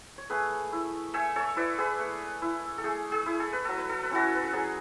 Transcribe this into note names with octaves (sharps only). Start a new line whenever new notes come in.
C#5
A3 G#4 B4
E4
A3 E5 G#5
A4 C#5
E4 B4 D5
G#4 B4
A3
E4
A4
A3 G#4
G#4
E4
A4
B4
F#3 A4
B4
A4
B4
C#4 E4 F#4 A4
B4
A4
F#3 G#4